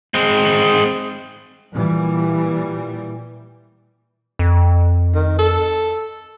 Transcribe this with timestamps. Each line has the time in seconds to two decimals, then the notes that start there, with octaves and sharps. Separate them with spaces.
0.14 G#3 C4
1.72 A#2 E3 G3
4.39 F2
5.15 D#3
5.38 A4